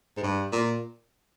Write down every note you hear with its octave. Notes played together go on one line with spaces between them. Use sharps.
G#2
G2
A#2